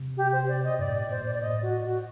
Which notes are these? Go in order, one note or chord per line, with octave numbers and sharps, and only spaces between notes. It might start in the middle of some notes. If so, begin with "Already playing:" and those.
Already playing: C3
G4
C5
D5
D#5
G2 D5
A2
A#2 D5
C5
A#2 D5
D5
A2 D#5
F#4
F#4